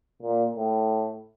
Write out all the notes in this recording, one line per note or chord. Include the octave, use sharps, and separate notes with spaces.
A#2
A2